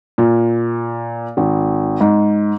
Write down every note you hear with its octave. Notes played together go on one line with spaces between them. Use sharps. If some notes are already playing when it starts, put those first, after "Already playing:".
A#2
G#1
G#2